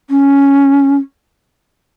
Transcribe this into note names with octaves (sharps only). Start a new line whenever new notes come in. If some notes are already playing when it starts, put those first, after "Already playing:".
C#4